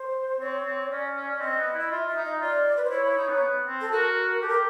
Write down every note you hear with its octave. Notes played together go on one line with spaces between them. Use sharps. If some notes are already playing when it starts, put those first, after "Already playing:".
Already playing: C5
C4 C#5
C4
C#4 D5
C#4
C#4
C4 D#5
B3
E4
D#5
F4 E5
E5
D#4
D#5
F4 D5
B4
C5
E4 C#5
E4
D#4
B3
B3
C4
A4
F#4 A#4
G4 A4
A#4